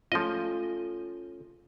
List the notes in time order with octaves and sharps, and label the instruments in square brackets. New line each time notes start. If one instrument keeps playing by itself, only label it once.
[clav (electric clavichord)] F3 D#5 [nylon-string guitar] A3 C#4 F4